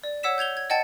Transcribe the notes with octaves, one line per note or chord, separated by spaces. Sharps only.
D5
C#5 F#5 E6 B6 E7
G6 G#6 F7 G7
G#6
D#5 F#5 G5 A5 A6 C#7